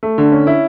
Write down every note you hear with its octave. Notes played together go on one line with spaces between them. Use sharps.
A3
D3
C#4
E4